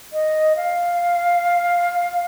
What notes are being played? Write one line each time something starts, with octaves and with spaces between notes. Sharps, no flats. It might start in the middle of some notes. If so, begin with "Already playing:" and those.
D#5
F5